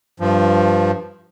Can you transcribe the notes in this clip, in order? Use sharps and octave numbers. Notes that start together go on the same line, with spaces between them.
G2 F3